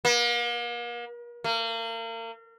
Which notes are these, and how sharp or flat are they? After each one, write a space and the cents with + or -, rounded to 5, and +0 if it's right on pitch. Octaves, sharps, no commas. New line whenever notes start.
A#3 +40
A#3 -35